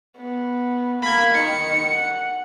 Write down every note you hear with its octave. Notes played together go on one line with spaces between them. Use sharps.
B3
A#3 B5 G#6
D#3 C#7
F#5